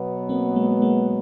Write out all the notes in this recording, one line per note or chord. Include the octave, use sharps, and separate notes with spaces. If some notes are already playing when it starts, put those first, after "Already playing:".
Already playing: B2 F#3 B3
A#3 C4
G#3 A#3
G#3 A#3